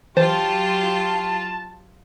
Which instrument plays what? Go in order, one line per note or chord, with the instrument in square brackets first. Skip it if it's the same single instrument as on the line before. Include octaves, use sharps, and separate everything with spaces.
[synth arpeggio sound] E3 C5 [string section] F#3 F4 [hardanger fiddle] G4 [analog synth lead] A5